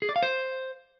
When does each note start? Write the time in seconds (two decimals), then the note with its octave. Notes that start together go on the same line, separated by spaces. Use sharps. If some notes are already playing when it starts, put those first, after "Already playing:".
0.02 G#4
0.09 D5
0.16 F5
0.23 C5